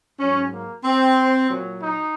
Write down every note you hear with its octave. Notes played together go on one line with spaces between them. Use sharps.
G#2 F#3 C#4
A#3
C4
A#2 F#3
D#4